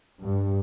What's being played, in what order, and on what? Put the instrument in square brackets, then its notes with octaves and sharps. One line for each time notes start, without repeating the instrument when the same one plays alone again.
[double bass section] G2